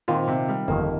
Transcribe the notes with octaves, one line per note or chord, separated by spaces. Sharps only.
A#2 D#3 C4 F4 C5
C3
G3
G1 F2 D#3 A#3